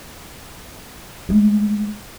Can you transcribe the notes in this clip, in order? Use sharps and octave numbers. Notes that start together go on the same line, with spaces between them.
G#3 A3